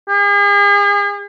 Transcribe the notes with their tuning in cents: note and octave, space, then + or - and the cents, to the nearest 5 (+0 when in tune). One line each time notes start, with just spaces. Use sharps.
G#4 -40